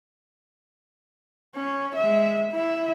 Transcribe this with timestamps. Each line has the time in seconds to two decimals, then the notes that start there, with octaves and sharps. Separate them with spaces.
1.56 C#4
1.95 G#3 E5
2.51 E4 E5